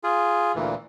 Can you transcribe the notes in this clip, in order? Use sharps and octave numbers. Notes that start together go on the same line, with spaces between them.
F4 G#4
D2 A#2 E3